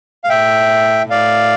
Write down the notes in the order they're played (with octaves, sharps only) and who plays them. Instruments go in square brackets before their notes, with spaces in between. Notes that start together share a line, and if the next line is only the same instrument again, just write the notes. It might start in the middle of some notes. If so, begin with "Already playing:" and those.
[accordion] F5
[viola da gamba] A2 [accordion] E5 G5
[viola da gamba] A2 [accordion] D5 F5